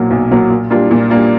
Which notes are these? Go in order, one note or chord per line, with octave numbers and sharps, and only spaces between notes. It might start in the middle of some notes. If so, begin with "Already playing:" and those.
Already playing: B1 A#2 F#3 A#3
B1
A#2 F#3 A#3
A#2
G3 A#3 D4 F4
A#2
G3 A#3 D4 F4